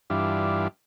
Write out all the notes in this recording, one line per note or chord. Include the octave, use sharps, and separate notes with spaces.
G2 E3 D4 F4